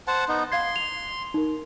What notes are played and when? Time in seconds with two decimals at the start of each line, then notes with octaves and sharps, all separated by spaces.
0.07 C5 F#5 A5
0.28 B3 D#4
0.52 F5 C6 G#6 C7
0.76 F7
1.34 D#4 A#4